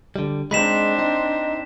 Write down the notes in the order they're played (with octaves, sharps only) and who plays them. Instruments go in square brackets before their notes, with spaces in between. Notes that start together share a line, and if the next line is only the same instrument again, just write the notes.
[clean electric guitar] D3 G3
[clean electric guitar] G#3 D#4 [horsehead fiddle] C4 D4 [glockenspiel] B5 B6 E7
[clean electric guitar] D#4